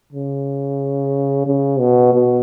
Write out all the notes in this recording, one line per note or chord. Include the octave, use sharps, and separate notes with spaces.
C#3
C#3
B2
B2